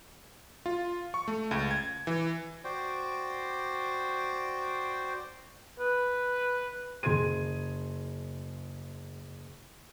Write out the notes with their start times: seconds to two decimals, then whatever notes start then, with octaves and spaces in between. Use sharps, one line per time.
0.66 F4
1.14 C#6
1.28 A3
1.51 C#2
1.71 G#6
2.07 E3
2.64 F#4 C5 D5 G5
5.79 B4
7.03 F#1 G#4 C6 G#6 D#7